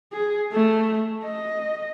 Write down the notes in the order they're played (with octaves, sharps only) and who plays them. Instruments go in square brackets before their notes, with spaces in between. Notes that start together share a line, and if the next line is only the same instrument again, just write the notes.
[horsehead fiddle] G#4
A3
D#5